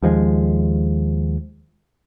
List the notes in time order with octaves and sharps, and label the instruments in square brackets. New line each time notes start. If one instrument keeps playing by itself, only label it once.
[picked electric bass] D#2 F3 G3 G#3